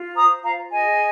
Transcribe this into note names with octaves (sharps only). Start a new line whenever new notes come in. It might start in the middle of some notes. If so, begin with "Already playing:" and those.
Already playing: F4
C5 A#5 D#6
F4 F5 A#5
G#4 D#5 G#5